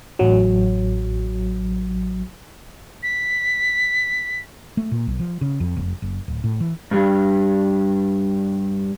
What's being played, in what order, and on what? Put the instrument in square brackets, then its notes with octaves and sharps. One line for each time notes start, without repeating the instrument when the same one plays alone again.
[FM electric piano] A1 F#3
[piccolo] B6
[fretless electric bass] A3
A#2
B1
F3
C#3
F2
F1
F#1
D1
A2
E3
[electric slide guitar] G2 G3